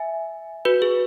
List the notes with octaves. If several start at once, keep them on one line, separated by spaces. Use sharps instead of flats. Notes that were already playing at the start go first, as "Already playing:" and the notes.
Already playing: E5 G#5
F#4 B4
G#4